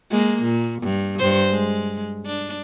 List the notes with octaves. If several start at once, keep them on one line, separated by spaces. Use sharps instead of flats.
G#3 A#3
A#2
G2
G2 C5
G#3
D4